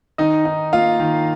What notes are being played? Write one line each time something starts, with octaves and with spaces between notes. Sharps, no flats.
D#3 D#4 D#5
D#4
A#3 F4 F5
D#3